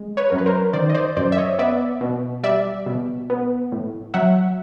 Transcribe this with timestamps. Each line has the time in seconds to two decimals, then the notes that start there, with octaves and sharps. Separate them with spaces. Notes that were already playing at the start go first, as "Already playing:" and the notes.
Already playing: G#3
0.17 B4 C#5
0.30 F#2 A#4
0.38 B4
0.46 A#4 C5
0.73 D#3 C5 D5
0.90 D#5
0.95 C5 D5
1.17 F#2 C5 D5
1.32 E5
1.37 C#5 D#5
1.59 B3 D5 E5
2.01 B2
2.43 G3 D5 E5
2.86 B2
3.30 B3
3.72 A2
4.14 F#3 E5 F#5